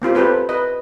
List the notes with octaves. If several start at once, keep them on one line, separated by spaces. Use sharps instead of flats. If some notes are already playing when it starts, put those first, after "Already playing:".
A#3 C4 F4 G4
C4 G4 A4 B4 C5
B4 D#5